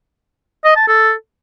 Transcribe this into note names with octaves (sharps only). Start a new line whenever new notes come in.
D#5
A5
A4